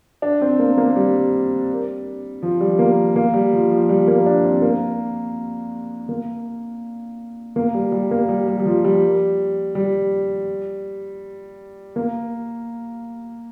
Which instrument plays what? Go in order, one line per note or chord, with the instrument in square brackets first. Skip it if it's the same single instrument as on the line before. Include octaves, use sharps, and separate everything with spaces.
[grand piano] D4
C4
A#3
A#3
G3
F3
G3
A#3
A#3
G3
F3
F3
G3
A#3
D4
C4
A#3
A#3
A#3
G3
G3
A#3
G3
G3
G3
F3
G3
G3
A#3